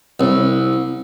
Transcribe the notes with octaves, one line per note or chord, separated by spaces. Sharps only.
C2